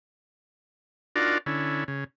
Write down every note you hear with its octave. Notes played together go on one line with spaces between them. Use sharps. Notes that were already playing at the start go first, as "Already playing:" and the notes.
D4 D#4 F4 F#4 A#4 D5
D3 C#4 E4
C#3